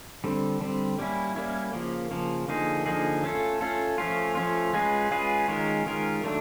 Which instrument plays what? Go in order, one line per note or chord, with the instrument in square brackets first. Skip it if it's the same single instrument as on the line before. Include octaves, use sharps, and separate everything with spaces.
[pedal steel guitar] D3 G3 C4
D3 G3 C4
G3 A#3 C#4 E4
G3 A#3 C#4 E4
C#3 F3 A#3
C#3 F3 A#3
D3 F3 A#3 D#4 G#4
D3 F3 A#3 D#4 G#4
A3 C#4 F4 A4
A3 C#4 F4 A4
F3 A3 C#4 F4
F3 A3 C#4 F4
G#3 C#4 F4 G#4 B4
G#3 C#4 F4 G#4 B4
D#3 G#3 C#4 F4 A#4
D#3 G#3 C#4 F4 A#4
D#3 F#3 A3 D4